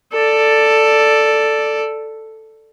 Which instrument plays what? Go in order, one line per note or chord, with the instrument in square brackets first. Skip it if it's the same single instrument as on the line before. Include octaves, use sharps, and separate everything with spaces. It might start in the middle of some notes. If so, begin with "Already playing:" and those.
[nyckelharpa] A4 D5